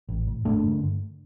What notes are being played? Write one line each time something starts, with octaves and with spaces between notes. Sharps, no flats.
A1
A2
G1 A3 D4
G2 D3